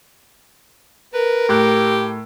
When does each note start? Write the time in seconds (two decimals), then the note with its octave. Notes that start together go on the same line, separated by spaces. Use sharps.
1.14 A#4 B4
1.49 A2 G4 F#6